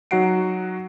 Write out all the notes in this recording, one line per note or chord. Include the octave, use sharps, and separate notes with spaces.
F#3 D#4 F#4 F#5 C7 D7